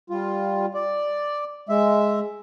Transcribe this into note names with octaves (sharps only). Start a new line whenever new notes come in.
G3 F4
D5
G#3 E5